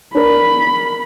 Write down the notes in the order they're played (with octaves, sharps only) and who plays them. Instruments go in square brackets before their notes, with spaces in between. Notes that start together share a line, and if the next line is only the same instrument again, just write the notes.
[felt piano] D4 A#4 [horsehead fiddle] B5